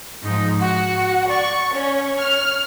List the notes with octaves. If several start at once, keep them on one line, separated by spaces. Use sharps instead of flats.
G#2 F3 D#4
F#4 F#5
D5 C#6
C#4 C#5
F6